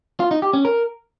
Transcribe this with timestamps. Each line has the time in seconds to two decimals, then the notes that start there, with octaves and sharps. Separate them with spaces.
0.20 F4
0.31 D#4
0.42 G4
0.53 C#4
0.65 A#4